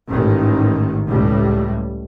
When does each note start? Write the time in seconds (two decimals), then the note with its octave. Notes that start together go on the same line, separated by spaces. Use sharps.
0.11 A1 G#2 D#3
1.09 C#2 A2 G3